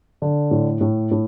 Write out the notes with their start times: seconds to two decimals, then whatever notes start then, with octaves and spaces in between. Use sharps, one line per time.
0.22 D3
0.51 A2
0.81 A2
1.11 A2